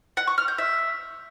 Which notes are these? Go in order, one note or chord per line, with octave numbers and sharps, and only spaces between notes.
F#5
C#6
F6
G6
E5